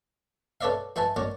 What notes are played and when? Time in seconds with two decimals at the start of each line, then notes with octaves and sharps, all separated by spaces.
0.61 A4 B4 C#5 D5 E5 F5
0.96 F#4 B4 E5 G#5 A5
1.16 F#4 A#4 C#5 D5